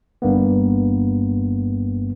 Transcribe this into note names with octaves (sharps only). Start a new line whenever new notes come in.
G1 G2 A#3 B3